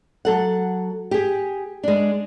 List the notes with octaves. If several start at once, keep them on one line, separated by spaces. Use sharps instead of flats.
F#3 A4 F#5
G4 G#4
G#3 D4